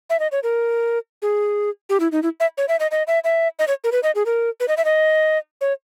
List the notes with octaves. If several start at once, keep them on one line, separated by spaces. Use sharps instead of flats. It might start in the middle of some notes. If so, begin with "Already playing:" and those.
E5
D#5
C#5
A#4
G#4
G4
E4
D#4
E4
E5
C#5
E5
D#5
D#5
E5
E5
D#5
C#5
A#4
B4
D#5
G#4
A#4
B4
D#5
E5
D#5
C#5